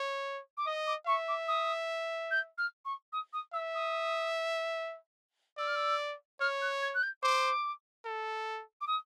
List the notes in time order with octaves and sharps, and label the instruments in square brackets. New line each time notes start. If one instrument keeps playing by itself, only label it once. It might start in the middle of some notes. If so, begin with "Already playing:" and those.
Already playing: [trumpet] C#5
[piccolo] D6
[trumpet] D#5 [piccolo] D#6
[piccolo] D6
[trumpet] E5 [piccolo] C#6
[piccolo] D6
D#6
G6
F6
C#6
D#6
D#6
[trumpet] E5 [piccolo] E6
[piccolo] D#6
[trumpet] D5 [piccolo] E6
[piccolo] F6
E6
[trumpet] C#5 [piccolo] F6
[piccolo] F#6
G#6
F#6
G6
[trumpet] C5 [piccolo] D6
[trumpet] A4
[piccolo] D6
D#6